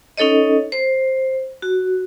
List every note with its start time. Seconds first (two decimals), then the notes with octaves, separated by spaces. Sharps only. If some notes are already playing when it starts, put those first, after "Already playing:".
0.18 C#4 D#4 A4 C#5 D#5
0.72 C5
1.62 F#4